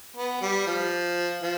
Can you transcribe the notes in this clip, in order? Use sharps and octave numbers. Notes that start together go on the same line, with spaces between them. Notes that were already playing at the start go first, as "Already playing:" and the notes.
B3
G3
F3
F3